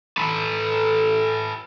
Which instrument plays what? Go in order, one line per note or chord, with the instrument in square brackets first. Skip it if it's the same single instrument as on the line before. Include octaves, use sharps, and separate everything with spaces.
[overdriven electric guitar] A4 B4